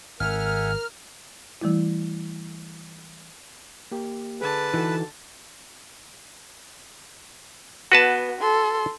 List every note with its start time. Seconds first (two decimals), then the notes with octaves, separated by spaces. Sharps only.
0.20 G#1 A#4 E5 F#5 G#5 F6
1.61 E3 G3 A3 E4
3.92 A#3 G4
4.41 D3 G#4 B4 A5
4.74 E3 D#4 F#4 A4
7.92 B3 F#4 B4 A5
8.40 A4 C6